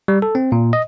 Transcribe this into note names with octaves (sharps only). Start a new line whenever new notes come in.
G3
A4
C4
A#2
D#5